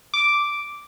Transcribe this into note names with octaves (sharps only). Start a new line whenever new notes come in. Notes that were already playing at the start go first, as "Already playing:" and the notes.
D6